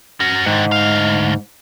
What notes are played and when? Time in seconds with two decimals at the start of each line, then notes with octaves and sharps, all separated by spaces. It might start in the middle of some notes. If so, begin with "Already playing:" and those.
0.20 C#4 F#4
0.46 G#2 D3 D#3
0.72 D2 F5